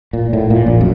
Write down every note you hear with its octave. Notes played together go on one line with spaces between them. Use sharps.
A#2
A2
A#2
A#1
F#2